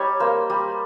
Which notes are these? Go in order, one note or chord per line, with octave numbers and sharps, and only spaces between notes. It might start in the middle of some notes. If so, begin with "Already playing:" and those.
Already playing: G3 D#4 C#5
A#3 C5
G3